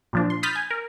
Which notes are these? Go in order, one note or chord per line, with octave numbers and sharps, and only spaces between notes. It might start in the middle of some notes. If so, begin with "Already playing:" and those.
A#2 F3 D4
C6
B5 D#6 F6 G6 A6 B6
G#5
A#4